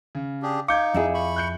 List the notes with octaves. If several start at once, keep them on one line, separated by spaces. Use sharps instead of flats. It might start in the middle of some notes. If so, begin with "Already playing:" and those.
C#3
D4 G4 G#4
D#4 F5 D6 G6 G#6 C#7
F2 E4 G#4
B5 C#6
F#6 G6 C#7